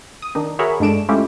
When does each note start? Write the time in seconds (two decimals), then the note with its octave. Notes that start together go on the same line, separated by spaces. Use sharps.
0.22 D#6
0.35 D#3 D4 D#4
0.59 F#4 G#4 A#4 C#5 E5 B5
0.80 G2 G#3 A3 D4 D7 E7
1.09 G#3 A3 C#4 E4 F4 G4